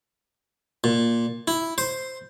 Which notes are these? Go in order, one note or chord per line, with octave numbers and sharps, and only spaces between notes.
A#2
E4
C5